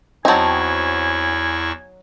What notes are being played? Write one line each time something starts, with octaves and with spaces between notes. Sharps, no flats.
E2 F#3 C4 D#4 E4 G#5 A5 C#6